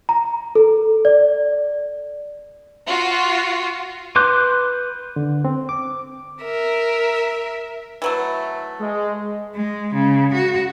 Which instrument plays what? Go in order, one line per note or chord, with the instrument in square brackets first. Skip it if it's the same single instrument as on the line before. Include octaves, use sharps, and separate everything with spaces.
[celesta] A#5
A4
D5
[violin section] F4 F#4
[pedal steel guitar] B4 C6 D6 F#6 G6
[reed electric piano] D3
C4
D6
[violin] A#4 E5
[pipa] E3 F#3 A3
[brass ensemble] G#3
[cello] G#3
C#3
F#4